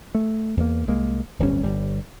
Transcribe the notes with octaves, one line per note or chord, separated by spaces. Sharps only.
A3
E2 A#3
C2 G#3 A#3
D1 G1 G3 C#4
G1 G3